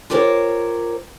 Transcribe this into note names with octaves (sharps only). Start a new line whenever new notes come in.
F4 G4 A#4 C5 C#5